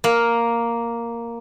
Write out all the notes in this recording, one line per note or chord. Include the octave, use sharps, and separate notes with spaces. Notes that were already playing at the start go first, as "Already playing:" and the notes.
A#3